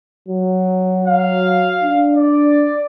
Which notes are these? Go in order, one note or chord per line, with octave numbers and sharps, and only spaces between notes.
F#3
F5
D4
D5